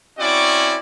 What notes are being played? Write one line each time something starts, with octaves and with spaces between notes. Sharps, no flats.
C4 C#4 E4 F#4 D5